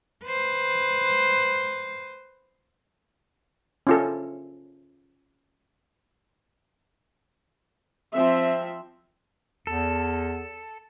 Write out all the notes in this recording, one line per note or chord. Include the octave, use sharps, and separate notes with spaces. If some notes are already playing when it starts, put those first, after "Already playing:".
B4 C5
C#4 F4 A4
F3 C4 E5
E2 A4